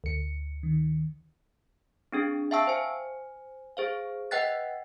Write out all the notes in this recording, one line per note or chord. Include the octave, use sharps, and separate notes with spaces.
D2 C#7
D#3
C4 D4 G#4
E5 F5 G5 A5 C#6 E6
C5 G#5
G#4 C5 F5
B4 D#5 F#5 G5 F#6 A6